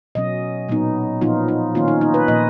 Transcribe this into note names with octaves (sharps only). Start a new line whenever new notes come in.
B2 F#3 C#4 D#5
A#2 F#3 B3 D#4
A#2 F3 B3 D#4 F4
D#4
D#3 A#3 C#4 F4
D#4
D#4
B4
A#2 F3 A#3 D#5